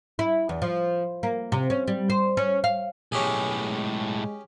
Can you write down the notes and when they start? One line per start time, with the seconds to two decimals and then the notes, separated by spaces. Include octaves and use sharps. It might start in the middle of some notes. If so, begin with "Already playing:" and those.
0.19 E4
0.49 E2
0.62 F3
1.23 A#3
1.52 C3
1.70 C#4
1.88 G3
2.10 C5
2.37 C#4
2.64 F5
3.12 B1 A2 C#4 G4 G#4
3.64 G#3